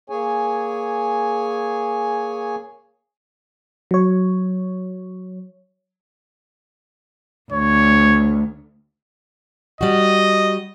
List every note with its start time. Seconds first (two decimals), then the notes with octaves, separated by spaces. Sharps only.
0.10 A#3 G#4 C#5 G#5
3.91 F#3 C#5
7.52 D2 C#5
9.81 G3 F#4 D#5